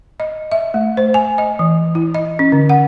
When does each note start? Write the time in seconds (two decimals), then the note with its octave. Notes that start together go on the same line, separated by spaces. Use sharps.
0.20 D#5
0.52 E5
0.74 A3
0.97 C5
1.14 G#5
1.38 D#5
1.59 E3
1.95 E4
2.15 D#5
2.39 C#4
2.52 D3
2.69 F#5